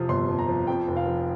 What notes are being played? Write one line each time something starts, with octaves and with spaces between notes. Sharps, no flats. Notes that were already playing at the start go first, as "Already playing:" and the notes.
Already playing: F2 C3 F3 D#6 F6
G1 C6
F2
A#5
F3
F2 G5
F1
F5
F3